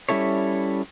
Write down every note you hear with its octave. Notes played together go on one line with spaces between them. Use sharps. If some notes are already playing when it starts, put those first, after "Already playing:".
G3 C#4 E4 A4 C#5